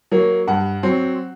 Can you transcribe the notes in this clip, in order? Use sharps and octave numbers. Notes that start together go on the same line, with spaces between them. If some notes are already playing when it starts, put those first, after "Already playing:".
F#3 A#3
G2 F#5
F#3 C4